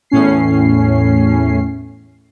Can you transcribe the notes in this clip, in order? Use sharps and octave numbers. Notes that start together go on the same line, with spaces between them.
E2 A2 C#4 C7